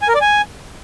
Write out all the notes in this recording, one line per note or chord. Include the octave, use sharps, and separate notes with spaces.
G#5
A#4
D5
G#5